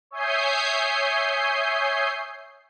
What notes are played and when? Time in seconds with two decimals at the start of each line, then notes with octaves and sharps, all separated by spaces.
0.11 C#5 E5 G#5 D#6 G6 C7